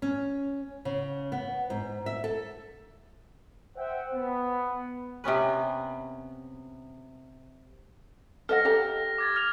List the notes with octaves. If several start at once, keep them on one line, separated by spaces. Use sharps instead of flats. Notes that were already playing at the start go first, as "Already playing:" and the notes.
C#4
C#3
B3
G#2
E5
A4
C5 E5 F#5 G5
B3
C3 B3 C#4 B4
A4 D#5 F#5 F6 A#6
G4 A4 A#5
D6 G#6 A6
F6 F7